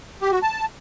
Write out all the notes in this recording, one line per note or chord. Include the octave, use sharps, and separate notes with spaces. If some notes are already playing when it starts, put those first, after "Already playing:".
G4
F#4
A5